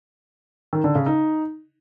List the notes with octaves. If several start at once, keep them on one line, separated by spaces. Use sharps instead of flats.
D#3
D3
C#3
D#4